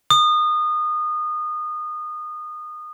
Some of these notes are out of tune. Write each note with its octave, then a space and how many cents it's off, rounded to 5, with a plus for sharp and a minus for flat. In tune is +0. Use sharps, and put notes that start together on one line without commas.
D#6 -25